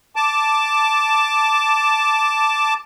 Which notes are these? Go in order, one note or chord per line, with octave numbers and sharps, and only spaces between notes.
A5 D6